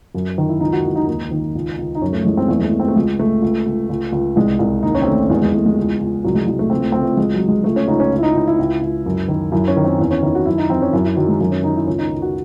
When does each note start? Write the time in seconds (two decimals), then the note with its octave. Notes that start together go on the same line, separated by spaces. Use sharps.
0.15 F#2
0.38 D#3
0.49 E4
0.60 C#2 D#4
0.73 F#4
0.84 C#2 E4
0.96 D#4
1.07 D#2 D#4
1.31 D#3
1.55 C#2
1.79 C#2
1.95 D#4
2.02 F#2 C#4
2.13 A3
2.25 E3 G#3
2.37 C4
2.48 E2 A3
2.59 G#3
2.65 A3
2.72 E2
2.80 C4
2.88 A3
2.95 C#2 G#3
3.20 C#2 A3
3.42 C#2
3.66 C#2
3.89 C#2
4.12 C#2
4.36 C2 G#3
4.59 C2
4.83 D#2 D#4
4.95 C#4
5.02 C4
5.07 D#3 A3
5.30 E2 G#3
5.42 G#3
5.54 E2 A3
5.66 G#3
5.77 C#2
6.00 C#2
6.24 C2 F#3
6.35 G#3
6.47 C2 G#3
6.59 A3
6.70 C#2 C4
6.80 A3
6.92 C#2 C4
7.03 A3
7.17 C#2 G#3
7.34 F#3
7.41 C#2
7.49 G#3
7.64 C#2 A3
7.76 C#4
7.88 C#2 D#4
8.00 C#4
8.12 C#2
8.18 E4
8.23 D#4
8.35 C#2 E4
8.47 E4
8.59 C#2
8.82 C#2
9.06 F#2
9.28 D#3
9.52 F#2 E4
9.68 C#4
9.77 D#3
9.84 C4
10.00 E2
10.11 C#4
10.23 D#3 E4
10.35 F#4
10.46 F#2 E4
10.58 D#4
10.70 E3 C4
10.82 C#4
10.93 F#2 E4
11.04 E4
11.16 D#3 F#3
11.28 G#3
11.41 F#2
11.51 C#4
11.63 D#3 D#4
11.76 E4
11.87 C#2 C#4
11.98 D#4
12.10 C#2
12.22 F#4